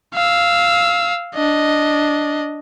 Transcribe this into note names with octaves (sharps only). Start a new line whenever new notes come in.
F5 E6
D4 D#5